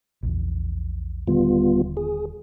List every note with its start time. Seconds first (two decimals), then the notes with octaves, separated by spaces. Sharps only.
0.23 A#1 E2
1.27 D#1 D3 D#3 G3 B3 F4
1.97 G#4